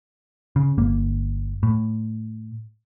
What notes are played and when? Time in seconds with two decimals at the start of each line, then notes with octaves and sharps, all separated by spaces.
0.56 C#3
0.78 G1 A#3
1.63 A2